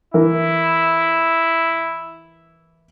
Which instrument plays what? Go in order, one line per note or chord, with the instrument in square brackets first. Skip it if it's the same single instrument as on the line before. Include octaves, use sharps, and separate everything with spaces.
[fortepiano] E3 A#4 [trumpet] E4